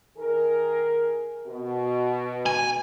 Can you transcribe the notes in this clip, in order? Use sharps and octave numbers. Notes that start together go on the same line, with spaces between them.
D#3 G#4 A#4
B2
G#5